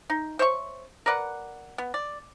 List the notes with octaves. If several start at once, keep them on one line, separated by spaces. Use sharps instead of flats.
D#4
C5 C#5 E5 C#6
A#4 B4 D5 F#5
B3
D5